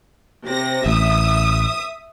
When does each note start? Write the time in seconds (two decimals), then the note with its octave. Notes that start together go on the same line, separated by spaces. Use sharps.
0.46 C3 A#6
0.86 A1 E5 D#6